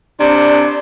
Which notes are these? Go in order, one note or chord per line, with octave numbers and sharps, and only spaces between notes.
C3 D4 D5